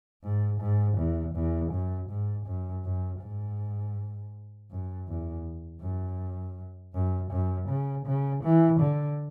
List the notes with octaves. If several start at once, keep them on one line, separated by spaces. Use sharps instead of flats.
G#2
G#2
E2
E2
F#2
G#2
F#2
F#2
G#2
F#2
E2
F#2
F#2
F#2
C#3
C#3
E3
D3